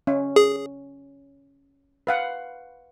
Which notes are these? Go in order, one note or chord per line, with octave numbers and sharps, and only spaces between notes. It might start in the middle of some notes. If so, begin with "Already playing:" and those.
C#4
G#4
B4 F5 F#5